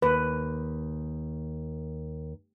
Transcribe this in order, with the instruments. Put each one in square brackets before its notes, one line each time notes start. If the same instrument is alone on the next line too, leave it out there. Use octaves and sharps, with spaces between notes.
[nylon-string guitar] D#2 [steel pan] B4